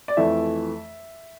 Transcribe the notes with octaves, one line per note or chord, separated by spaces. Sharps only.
D5
F2 E3 A3 E5